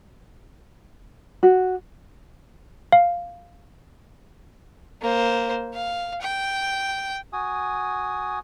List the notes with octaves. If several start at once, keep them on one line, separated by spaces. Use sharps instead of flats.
F#4
F5
A#3 C5
F5
G5
F#4 G#5 D#6